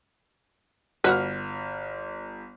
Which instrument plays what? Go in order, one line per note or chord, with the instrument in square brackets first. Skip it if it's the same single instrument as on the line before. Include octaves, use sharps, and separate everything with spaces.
[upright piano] G1 F6 [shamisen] F#4 B4